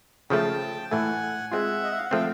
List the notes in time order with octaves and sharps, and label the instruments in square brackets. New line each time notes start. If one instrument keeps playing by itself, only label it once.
[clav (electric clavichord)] C#3 F3 A3 [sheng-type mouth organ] G5 A5
[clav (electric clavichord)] A2 E3 A3 [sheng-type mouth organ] F#5 G#5
[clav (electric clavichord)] G#3 C4 F4 [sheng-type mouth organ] E5 F#5
[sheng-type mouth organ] D#5
E5
F5
F#5
[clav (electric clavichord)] F3 A3 C4 [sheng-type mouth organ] F5 G5